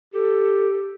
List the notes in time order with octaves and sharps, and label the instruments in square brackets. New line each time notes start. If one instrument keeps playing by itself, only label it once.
[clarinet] G4 [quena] A4